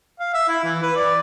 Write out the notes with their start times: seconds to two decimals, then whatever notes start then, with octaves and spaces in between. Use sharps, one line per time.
0.20 F5
0.34 E5
0.48 E4
0.64 E3
0.82 B4
0.96 D5